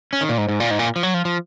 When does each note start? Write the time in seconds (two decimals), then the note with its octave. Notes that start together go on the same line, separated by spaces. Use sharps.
0.13 C#4
0.21 D#3
0.29 A#2
0.38 G#2
0.49 G#2
0.60 A#2
0.71 G#2
0.79 A#2
0.96 F3
1.03 F#3
1.14 F3
1.25 F3